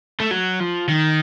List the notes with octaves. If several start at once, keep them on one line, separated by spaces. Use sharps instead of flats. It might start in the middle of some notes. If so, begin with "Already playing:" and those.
A3
F#3
F3
D#3